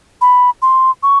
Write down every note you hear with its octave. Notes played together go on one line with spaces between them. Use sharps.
B5
C6
C#6